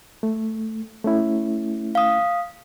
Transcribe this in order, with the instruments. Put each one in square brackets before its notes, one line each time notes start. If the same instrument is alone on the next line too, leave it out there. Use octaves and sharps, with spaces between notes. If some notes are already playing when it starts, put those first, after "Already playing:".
[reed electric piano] A3
A3 C#4 E4
[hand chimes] F5 D#6